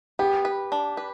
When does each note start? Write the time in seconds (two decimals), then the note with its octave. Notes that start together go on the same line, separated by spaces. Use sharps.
0.19 B3 G4
0.45 B4
0.72 D4
0.97 B4